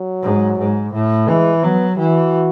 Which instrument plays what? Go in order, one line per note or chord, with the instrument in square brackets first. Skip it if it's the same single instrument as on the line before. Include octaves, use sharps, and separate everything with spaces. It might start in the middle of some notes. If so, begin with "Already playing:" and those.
Already playing: [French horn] F#3
[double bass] G#2
G#2
A2
[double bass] E3 [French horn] G#3
[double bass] F#3 [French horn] B3
[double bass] E3 [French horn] F#4